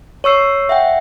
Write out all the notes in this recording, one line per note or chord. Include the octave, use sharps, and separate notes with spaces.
C#5 C#6 E6 C7
E5 F#5 G5